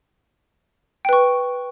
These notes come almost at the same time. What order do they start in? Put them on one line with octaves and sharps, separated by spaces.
G5 B4 C#6